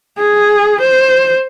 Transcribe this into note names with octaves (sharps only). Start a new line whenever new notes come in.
G#4
C5